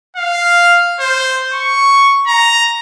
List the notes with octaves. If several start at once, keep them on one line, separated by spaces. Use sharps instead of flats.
F5
C5
C#6
A#5